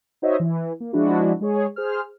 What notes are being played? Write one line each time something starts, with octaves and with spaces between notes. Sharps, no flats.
D#4 F#4 C5 C#5 D#5 E5
E3
A#3
F3 G#3 D4 E4 F#4
G#3 G#4 C#5
G#4 C5 F6